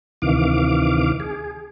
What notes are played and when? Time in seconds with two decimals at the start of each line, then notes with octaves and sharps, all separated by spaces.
0.22 D2 C3 D#3 E3 F5 D6
1.20 G#4